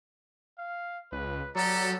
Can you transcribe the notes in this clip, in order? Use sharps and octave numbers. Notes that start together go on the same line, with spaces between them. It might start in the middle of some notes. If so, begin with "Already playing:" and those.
F5
C#2 B4
F#3 B3 G4 A4 D5 A#5